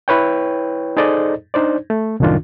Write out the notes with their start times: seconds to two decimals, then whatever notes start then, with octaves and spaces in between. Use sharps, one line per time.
0.08 E4 B4 C#5 G5
0.97 D#4 G#4 A4 C5 D5 D#5
1.54 D4 D#4 C5 D5
1.90 A3
2.20 C2 F#2 A2 D#3 D4 F4